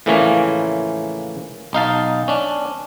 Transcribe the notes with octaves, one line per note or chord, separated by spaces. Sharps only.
A2 C#3 E3 F3 A#3 C#4
B1 D#4 F5 A5
C#4 D4